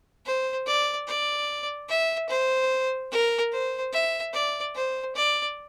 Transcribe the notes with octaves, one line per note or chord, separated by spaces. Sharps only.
C5
D5
D5
E5
C5
A#4
C5
E5
D5
C5
D5